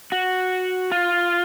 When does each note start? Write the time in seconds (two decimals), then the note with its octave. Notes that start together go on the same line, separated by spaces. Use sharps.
0.12 F#4
0.92 F4